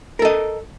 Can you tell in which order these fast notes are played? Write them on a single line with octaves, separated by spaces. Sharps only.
A#4 A4 D#5